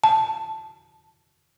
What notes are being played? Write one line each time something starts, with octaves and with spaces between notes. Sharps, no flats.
A5